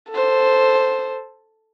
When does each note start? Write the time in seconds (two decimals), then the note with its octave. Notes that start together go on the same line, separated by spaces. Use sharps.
0.11 A4 C5